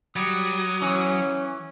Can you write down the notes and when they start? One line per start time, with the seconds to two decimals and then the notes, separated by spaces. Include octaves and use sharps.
0.16 F#3 G3 D#6
0.82 E3 C#4